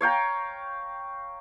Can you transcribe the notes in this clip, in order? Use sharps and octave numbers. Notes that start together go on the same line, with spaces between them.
C#5 F5 G5 A#5